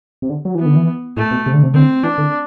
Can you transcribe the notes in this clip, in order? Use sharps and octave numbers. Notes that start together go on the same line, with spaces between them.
C3
D3
F#3
E3 B3
D3
E3
A2 A3
B2
C3
D3
C3
D3 C4
E3 D4
D3